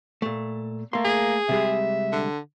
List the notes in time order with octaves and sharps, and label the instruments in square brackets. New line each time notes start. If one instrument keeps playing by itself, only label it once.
[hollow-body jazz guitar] A#2 A3
[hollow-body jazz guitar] A3 C6 [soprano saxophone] A#3
[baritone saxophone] G#4
[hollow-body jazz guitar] C3 G3 G#3 [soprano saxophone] E5
[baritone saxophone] D3